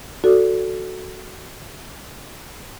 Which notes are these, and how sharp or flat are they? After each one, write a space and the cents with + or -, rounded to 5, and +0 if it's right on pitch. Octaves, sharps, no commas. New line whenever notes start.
F#4 +0 A4 +0 D5 -30